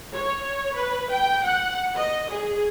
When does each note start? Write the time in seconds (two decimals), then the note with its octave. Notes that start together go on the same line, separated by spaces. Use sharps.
0.14 C#5
0.74 B4
1.11 G5
1.44 F#5
1.96 D#5
2.29 G#4